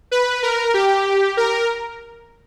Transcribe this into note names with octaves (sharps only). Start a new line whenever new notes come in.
B4
A#4
G4
A#4